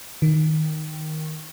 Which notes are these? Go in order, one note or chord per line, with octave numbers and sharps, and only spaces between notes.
D#3